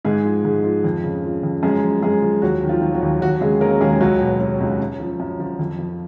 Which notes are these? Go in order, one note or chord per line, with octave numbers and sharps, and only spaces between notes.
G#2 G#3 G#4
F3
G#2
F3
F2
C#3
F3
F2
F#2 G#3 G#4
F3
F#2 G#3 G#4
F3
D#2 F#3 F#4
D#3
F3 F4
F#3
F#3 F#4
D#2
D#2 F#3 F#4
C#3 G#3 G#4
F#3 A#3 A#4
D#2 G#3 G#4
C#2 F#3 F#4
B2
F#3
C#2
F#2
F3
F#2
F3
F2
F3